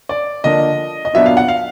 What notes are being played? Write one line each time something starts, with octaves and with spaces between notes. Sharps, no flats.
D5
D3 F3 A#3 D4 D#5
D#5
A#2 F#3 B3 D4 E5
F5
F#5
F5